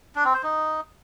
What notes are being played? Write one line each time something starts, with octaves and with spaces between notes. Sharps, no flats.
D4
C4
C5
D#4